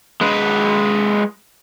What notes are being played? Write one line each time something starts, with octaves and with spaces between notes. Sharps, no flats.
G#3 B4